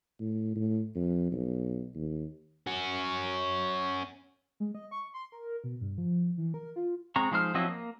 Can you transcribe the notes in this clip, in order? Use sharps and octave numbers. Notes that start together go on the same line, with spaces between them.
A2
A2
F2
B1
D#2
C#4 F#4
G#3
D#5
C#6
C6
A#4
B2
G2
F3
E3
A#4
F4
G#3 C4 A#5 C#6
F3 G#3 D#4 C5 F6
F3 F#3 C4 E4 D#5
A#3